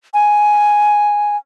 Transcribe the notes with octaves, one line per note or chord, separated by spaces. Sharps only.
G#5